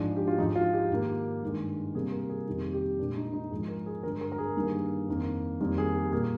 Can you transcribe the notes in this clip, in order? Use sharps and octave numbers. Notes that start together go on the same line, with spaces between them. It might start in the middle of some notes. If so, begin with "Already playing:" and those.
Already playing: G#2 F3 G#3 D4
G4
F4
G#2 F3 G#3 D#4
F4
G4
G#2 D#3 A#3
G2 D#3 G#3
C3 G3 A#3 G#4
A#4
G#4
F2 C3 D#3 G3 A#3 G4
G4
A#2 G#3 D4
D#4
D#4
G#2 F3 G#3 G#4
A#4
G#4
G2 D3 G#3 A#4
A#4
A#4
G#4
G2 D#3 G3 A#3
F2 D#3 A#3
F2 D#3 G3 A#3
G#4
G4
A#2 G3 A#3 G#4